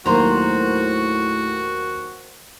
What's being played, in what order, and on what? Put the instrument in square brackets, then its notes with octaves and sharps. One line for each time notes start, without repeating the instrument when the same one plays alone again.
[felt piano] D#2 F#3 A#3 [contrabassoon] A2 [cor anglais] F#4 [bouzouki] C5 A#5